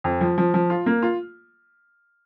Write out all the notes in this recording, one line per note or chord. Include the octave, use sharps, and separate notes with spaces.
F2
F3
F3
F3
F4
A#3
F4